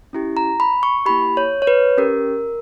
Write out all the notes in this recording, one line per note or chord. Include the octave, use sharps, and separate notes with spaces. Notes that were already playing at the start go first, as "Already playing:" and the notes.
C#4 E4 G4
A#5
B5
C#6
A#3 E4 G4 B5
C#5
C#5
B4
C#4 G4 A#4